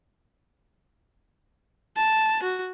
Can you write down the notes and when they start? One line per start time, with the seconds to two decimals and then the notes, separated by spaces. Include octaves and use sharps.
1.97 A5
2.43 F#4